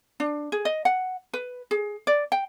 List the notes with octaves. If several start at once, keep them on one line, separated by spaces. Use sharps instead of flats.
D4
G#4
D#5
F#5
B4
G#4
D5
G5